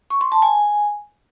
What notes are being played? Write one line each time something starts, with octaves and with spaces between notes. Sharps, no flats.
C#6
C6
A5
G#5